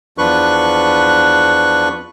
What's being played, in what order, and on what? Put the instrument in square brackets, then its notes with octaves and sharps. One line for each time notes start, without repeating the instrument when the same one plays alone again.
[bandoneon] E2 F3 D4 B4 C#6 F#6